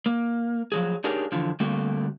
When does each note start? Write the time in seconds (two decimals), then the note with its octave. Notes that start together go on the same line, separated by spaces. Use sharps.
0.06 A#3
0.72 F3 F#3 G#4
1.04 D4 D#4 G4 G#4 A#4 C#5
1.32 F2 D3 E3 F3
1.60 D3 G3 A3 A#3 C4 F#4